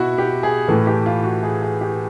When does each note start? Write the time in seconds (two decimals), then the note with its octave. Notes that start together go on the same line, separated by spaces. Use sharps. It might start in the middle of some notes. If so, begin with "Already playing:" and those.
Already playing: B2 E4 F#4
0.18 G4
0.43 G#4
0.68 A2 E3 A4
0.87 G4
1.06 F4
1.24 F#4
1.43 G#4
1.62 G#4
1.81 G4